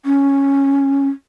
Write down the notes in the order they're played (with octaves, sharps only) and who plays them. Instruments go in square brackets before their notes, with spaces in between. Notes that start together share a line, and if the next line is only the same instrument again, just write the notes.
[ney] C#4